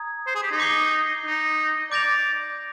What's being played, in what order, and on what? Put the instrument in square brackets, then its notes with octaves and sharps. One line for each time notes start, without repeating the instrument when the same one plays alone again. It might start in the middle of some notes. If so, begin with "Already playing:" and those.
Already playing: [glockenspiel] A#5 D#6 G#6
[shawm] C5
G#4
G4
D#4
[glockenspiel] D6 G6 C7 G7
[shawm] D#4
[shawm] D5 [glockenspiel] D6 G6 A#6 F7